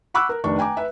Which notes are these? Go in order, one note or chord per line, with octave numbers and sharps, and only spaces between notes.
F#5 B5 C#6 D6 E6 F#6
A#4
F1 D#3 D4 C#6
G5 G#5 A#5 D6
B4 E5